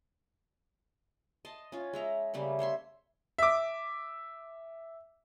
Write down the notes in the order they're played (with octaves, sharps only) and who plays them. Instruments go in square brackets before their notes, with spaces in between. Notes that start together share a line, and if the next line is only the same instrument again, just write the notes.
[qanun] D#5 A5 C6
C#4 F4
G#3 E5 A#5
C#3 G3 A3 A#3
C5 C#5 E5 C6
[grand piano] E5 D6